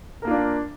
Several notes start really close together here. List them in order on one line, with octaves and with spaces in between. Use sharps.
A#4 A#3 F4 D4